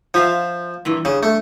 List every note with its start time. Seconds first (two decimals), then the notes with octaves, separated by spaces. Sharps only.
0.14 F3 F4 E5 F5
0.85 G2 A#2 E3
1.05 G2 C#3
1.23 A3